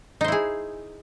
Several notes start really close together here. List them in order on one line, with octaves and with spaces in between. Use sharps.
D#4 C5 E4 G#4